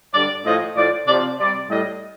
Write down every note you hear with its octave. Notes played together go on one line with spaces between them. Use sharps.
G2 D3 G3 D5
A2 F3 D#5
A2 F3 D5
C3 F3 D5
C3 G3 D5
A2 G3 D#5